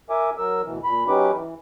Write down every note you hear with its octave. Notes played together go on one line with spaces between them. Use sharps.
A#4 E5 G#5 D6
F#3 A#4 E6
D2 B2 E3
A#2 B5
F#3 C#4 D#4 G4 B4 D6
E3